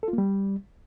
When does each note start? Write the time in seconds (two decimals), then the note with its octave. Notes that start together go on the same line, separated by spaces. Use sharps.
0.03 A4
0.08 F4
0.13 A#3
0.18 G3